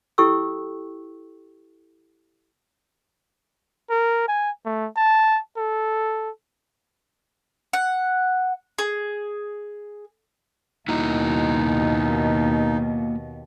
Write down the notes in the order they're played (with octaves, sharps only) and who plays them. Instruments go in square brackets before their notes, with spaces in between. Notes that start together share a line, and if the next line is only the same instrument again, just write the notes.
[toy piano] E4 G4 A4 G5 C#6 E6
[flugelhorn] A#4
G#5
A3
A5
A4
[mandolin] F#5
G#4
[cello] D#2 B2 [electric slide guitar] A#3 E4 F#4 [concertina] D#4